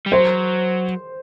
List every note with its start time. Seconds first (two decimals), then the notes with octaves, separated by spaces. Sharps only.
0.06 G3
0.12 F#3 C5